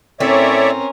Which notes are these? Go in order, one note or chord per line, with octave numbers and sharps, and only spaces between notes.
A2 C4 C#4 A#4 C#5 D5 E5